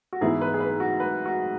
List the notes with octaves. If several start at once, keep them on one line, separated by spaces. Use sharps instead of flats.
F#4
G#2 E3 B3 E4 G#4
B4
G#4
B4
F#4
B4
F#4